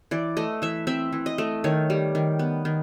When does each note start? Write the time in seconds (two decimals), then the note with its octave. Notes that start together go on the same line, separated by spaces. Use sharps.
0.11 E3 D5
0.37 A3 D#5
0.62 E3 E5
0.87 C4 E5
1.13 E3
1.26 D#5
1.38 A3
1.64 D#3 C#5
1.90 G3
2.15 D#3
2.39 B3
2.65 D#3